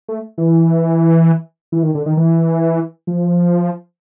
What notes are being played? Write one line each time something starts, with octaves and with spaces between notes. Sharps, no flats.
A3
E3
E3
D#3
D3
D#3
E3
F3